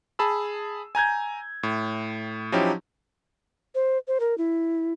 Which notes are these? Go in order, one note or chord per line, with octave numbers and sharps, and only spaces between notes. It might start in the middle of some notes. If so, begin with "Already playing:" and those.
G#4 A5 B5 E6
G#5 A#5 G6 G#6
A2
F3 F#3 C#4 D#4 E4 G4
C5
C5
A#4
E4